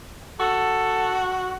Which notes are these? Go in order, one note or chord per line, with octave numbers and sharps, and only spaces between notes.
F#4 A4